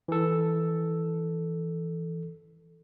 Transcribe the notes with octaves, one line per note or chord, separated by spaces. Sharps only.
E3 A4